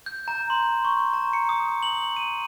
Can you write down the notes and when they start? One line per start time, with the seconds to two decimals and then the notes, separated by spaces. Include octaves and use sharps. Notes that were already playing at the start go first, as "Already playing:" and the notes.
0.06 G6
0.28 A#5
0.50 C6
0.85 C#6
1.13 A#5
1.33 C#7
1.49 D#6
1.83 F#7
2.16 D#7